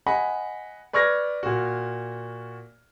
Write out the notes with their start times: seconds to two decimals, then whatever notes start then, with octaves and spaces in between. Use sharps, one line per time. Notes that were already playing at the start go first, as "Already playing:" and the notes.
0.06 D#5 F#5 G#5 B5
0.93 B4 D5 C#6 F6 G#6 A#6
1.43 A#2 F#4